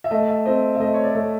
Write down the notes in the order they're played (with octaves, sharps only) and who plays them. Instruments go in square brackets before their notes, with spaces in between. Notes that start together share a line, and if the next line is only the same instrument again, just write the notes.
[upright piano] E5
[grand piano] A3 [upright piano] D#5
[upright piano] E5
[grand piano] C4 [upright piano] D#5
[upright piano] E5
[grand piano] A3 [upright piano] D#5
[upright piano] C#5
D5
[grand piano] A3